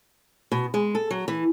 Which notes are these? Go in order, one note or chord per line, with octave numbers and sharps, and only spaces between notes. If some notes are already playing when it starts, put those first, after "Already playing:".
B2
G#3
A4
F#3
E3